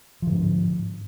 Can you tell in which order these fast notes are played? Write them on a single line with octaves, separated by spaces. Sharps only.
F3 D3 G#2